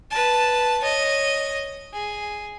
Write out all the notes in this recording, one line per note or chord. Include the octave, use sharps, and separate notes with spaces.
B4 A5
C#5 D#5
G#4